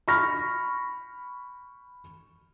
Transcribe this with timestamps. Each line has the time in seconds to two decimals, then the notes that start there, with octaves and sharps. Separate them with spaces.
0.08 B5 C#6 F6 A#6